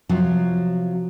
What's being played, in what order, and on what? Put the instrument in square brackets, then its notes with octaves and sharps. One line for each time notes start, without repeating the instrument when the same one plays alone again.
[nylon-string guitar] C3 F3 F#3 F4